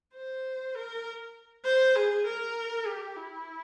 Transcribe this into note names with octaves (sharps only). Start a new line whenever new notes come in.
C5
A#4
C5
G#4
A#4
G4
E4